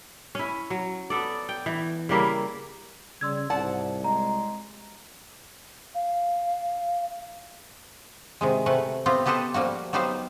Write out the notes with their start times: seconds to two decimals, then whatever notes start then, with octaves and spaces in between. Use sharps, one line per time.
0.35 C#4 E4
0.70 F#3
1.10 B3 A4 D5
1.49 G5
1.66 E3
2.09 C#3 G3 A#3 E4
3.21 C#3 G3 C6 E6 G#6
3.50 C2 G#2 D5 F#5 A5
4.04 G#3 A#5
5.95 F5
8.41 C3 D#3 G#3
8.66 C3 A3 B4 F#5
9.06 B3 C4 F4 G4
9.26 B3 G4 A4 B4 C5 D#5
9.54 F3 G3 A#3 F#4
9.93 F#3 B3 D#4 G4 C5 F5